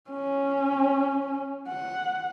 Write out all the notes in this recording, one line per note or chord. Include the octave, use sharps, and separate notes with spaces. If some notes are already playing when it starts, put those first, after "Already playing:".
C#4
F#5